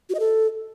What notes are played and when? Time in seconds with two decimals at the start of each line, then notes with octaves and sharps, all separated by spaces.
0.10 F#4
0.15 D#5
0.20 A4